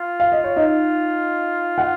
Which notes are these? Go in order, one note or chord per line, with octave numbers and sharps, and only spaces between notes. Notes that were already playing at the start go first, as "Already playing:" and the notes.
Already playing: F4
F5
D#5
C#5
D#4 D#5
F#5